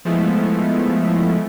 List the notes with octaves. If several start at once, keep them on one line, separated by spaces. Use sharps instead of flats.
F3 G#3 A3 B3 E4